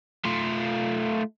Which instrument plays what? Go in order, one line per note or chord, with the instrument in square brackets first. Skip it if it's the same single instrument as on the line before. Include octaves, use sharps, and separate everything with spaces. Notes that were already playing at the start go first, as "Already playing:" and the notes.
[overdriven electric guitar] A3 F4